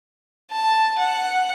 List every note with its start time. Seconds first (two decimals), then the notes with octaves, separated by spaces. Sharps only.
0.51 A5
0.98 F#5